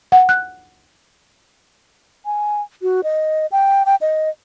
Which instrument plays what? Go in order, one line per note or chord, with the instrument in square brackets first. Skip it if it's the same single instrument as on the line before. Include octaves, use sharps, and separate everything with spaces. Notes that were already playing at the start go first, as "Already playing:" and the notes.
[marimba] F#5
F#6
[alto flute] G#5
F#4
D#5
G5
G5
D#5